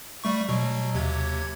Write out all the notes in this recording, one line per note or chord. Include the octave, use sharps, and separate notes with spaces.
G3 A3 C#6
B2 F#3
D#2 C3 G#6